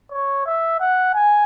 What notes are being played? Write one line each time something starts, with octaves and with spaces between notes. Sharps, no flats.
C#5
E5
F#5
G#5